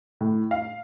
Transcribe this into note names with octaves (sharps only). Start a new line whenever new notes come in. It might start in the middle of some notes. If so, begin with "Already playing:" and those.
A2
F5